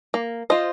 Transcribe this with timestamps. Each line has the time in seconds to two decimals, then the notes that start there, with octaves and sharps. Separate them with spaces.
0.14 A#3
0.50 F4 C5 D#5